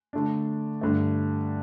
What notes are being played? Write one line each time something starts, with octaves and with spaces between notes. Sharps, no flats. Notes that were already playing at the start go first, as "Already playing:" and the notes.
D3 A3 D4
G2 D3 A3